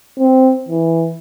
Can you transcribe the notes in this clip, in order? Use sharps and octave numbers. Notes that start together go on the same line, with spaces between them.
C4
E3